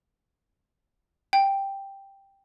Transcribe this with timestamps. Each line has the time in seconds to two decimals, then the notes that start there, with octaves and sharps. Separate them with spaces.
1.33 G5